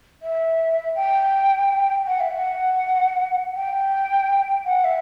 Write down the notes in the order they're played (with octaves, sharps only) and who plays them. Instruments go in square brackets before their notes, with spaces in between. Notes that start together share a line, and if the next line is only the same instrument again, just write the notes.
[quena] E5
G5
F#5
E5
F#5
G5
F#5
E5